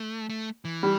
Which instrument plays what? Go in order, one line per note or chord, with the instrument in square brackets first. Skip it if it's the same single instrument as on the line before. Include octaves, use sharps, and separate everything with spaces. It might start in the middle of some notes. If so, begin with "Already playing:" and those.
Already playing: [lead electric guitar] A3
A3
E3
[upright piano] G3